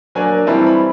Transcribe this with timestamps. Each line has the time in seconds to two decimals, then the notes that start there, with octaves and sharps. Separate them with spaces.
0.15 F#3 A#3 D4 G#5
0.47 E3 G3 C4 E4 A5
0.67 B5